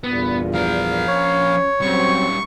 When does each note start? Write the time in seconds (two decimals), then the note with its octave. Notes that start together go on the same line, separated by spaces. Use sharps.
0.04 E2 G2 A#2 B3
0.54 F3 A#4 F5
1.08 C#4 C#5
1.81 F#3 G3 C4 C#4 C5 C#6